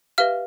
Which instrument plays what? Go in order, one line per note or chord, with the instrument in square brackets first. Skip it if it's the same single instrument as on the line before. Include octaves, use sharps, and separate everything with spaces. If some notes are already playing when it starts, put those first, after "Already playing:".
[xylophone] G4 B4 E5 F5 F6